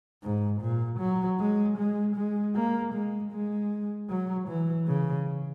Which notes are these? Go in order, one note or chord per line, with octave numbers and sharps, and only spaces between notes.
G#2
A#2
F#3
G#3
G#3
G#3
A#3
G#3
G#3
F#3
E3
C#3